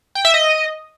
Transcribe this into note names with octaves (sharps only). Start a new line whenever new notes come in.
G5
E5
D#5